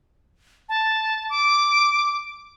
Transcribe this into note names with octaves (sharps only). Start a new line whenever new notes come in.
A5
D6